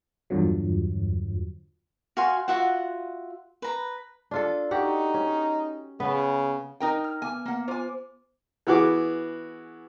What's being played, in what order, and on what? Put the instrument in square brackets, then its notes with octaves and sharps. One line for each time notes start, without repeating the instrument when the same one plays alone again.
[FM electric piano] E2 G2 D3 F3 F#3
[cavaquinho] F#4 F5 G#5 C6
F4 F#4 E5 F#5
B4 A#5
[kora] D4 F4 A4
[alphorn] D#4 [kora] F#4 G4 F#5
[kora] C#4
[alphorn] C#3 [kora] B3 B4
[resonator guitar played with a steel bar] D#4 A#4 G5
[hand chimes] F6
[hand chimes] B3 D6 [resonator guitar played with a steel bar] G#5
[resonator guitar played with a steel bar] A#3 F#5 [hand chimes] B3
[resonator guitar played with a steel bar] F4 G#5 [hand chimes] C5 D6
[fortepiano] E3 B3 F#4 G#4 D6